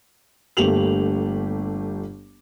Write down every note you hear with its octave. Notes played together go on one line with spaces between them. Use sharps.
G1 A3 A#3 G4 F7 F#7